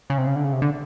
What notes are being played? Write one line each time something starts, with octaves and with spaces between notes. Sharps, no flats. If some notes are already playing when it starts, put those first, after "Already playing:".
C#3
C3
C#3
D3
C#3
C3
D3